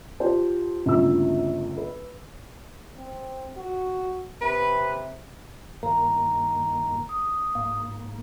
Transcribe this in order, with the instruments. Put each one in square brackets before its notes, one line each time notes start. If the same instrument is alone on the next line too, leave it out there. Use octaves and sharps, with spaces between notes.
[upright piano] F4 G4 C5 A5
G1 D2 C#3 A#3 F4 E6
B4
[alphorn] C4
F#4
[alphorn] C3 [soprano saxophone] B4
[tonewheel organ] G2 D#3 A#3 [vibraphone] A#5
[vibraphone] D#6
[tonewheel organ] G#2 A#3